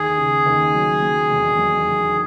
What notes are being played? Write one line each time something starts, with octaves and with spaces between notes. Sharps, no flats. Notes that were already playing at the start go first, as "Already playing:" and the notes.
Already playing: D#2 G#4
C#3
D#2
F#3
F#3
E1
F#3
E1